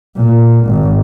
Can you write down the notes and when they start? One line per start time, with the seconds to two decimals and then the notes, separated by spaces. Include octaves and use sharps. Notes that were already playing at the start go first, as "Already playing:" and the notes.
0.16 A#2
0.65 G#1